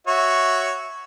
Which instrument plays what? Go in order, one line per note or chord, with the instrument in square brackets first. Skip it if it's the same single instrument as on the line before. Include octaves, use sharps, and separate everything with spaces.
[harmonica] F#4 C#5 E5